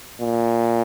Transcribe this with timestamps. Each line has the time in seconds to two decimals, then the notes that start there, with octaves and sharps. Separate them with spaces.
0.21 A#2